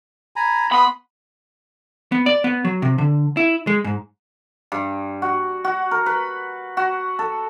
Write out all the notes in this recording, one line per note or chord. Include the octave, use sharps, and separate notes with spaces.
G#5 A#5 B5
B3 B5 C6 D#6
B3
D5
B3
F#3
C3
D3
E4
G#3
G#2
G2
F#4
F#4
A#4
B4
F#4
A4